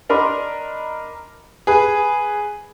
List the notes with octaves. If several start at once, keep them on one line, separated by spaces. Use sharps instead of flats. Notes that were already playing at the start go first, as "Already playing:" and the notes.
D4 A#4 D#5 B5 C6
G#4 B4